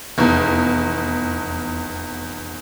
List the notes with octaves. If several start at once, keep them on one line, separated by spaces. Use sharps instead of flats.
F1 E2